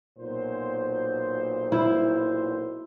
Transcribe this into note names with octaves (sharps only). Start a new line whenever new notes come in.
B1 A#2 C5
E4